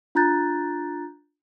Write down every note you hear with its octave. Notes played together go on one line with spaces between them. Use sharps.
D4 F4 A#5 F#6 G6 A6